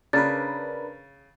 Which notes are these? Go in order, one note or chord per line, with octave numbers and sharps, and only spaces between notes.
C#3 D4 A#4 B4 A6